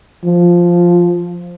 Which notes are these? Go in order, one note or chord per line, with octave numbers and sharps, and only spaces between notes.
F3